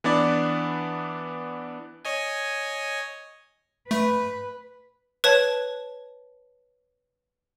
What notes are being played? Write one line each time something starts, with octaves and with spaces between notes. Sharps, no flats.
E3 B3 D4 D5
C#5 D#5 G#5
A3 B4
B4 C#5 A5